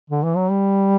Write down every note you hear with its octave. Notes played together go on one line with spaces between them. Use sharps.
D3
E3
F#3
G3